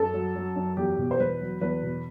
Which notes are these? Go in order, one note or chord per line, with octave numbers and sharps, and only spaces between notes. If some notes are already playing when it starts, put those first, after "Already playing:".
Already playing: F#2 A4
F#3
F#3
F#2
E2 G4
B2
C5
E2 B4
F#3
E2 B4
B2